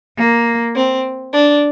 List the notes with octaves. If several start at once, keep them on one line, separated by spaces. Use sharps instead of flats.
A#3
C4
D4